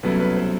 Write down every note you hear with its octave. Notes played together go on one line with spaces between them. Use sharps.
C2 B2 F#3 A3 C#4 B4
B4
C5